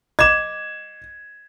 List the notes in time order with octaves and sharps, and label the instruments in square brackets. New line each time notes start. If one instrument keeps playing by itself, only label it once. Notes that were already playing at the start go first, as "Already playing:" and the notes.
[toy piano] D#5 D6 [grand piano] G#6 E7